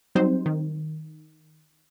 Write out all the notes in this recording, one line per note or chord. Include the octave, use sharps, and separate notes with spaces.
F#3 G3 C4 D#4 C5
D#3